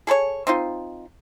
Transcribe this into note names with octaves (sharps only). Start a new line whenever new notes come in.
G#4 A4 B4 C#5
C4 D#4 F4